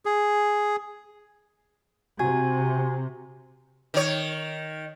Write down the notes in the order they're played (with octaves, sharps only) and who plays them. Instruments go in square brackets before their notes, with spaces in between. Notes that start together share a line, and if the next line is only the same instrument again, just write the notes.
[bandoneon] G#4
[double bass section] C3 [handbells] F#4 G#5 G#6
[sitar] D#3 C#5